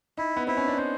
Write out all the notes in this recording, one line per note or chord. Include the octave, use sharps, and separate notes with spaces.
D#4 E4
B3
C4 E4
C#4
D4
D#4 C5